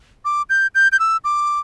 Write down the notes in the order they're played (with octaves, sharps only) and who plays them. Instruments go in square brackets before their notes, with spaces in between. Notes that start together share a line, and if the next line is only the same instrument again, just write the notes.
[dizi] D6
G6
G6
G6
E6
D6